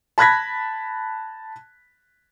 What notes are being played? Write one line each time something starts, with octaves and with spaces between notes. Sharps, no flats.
A5 B5 F#6 G#6 A#6 B6